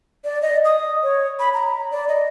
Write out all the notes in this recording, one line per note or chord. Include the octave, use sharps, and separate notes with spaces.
D5
D#5
D#6
C#5
B5
A#5
D5
D#5